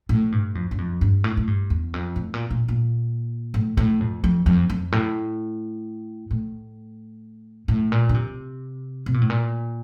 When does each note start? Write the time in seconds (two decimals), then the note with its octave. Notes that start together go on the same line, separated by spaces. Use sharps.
0.09 A2
0.32 G2
0.55 F2
0.71 G2
0.78 F2
1.01 G2
1.24 A2
1.37 A2
1.47 G2
1.70 E2
1.94 F2
2.16 A2
2.34 A#2
2.51 A#2
2.68 A#2
3.54 A2
3.77 A2
4.00 F2
4.24 F2
4.46 F2
4.70 F2
4.92 A2
6.31 A2
7.68 A2
7.92 A#2
8.09 D3
8.14 C3
9.06 C3
9.14 A#2
9.22 A2
9.30 A#2